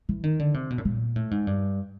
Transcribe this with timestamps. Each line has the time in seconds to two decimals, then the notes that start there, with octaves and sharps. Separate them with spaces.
0.09 E3
0.24 D#3
0.39 D3
0.54 C3
0.70 B2
0.78 A2
0.85 A#2
1.16 A2
1.31 G#2
1.47 G2